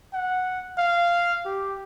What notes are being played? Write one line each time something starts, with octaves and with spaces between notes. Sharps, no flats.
F#5
F5
G4